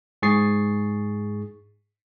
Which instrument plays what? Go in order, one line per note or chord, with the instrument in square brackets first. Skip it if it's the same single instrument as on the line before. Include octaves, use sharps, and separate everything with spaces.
[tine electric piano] G#2 G#4 C#6 A6 C7